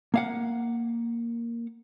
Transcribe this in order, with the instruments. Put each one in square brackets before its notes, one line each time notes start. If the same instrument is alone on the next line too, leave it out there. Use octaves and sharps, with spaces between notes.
[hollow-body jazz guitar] A#3 F5 F#5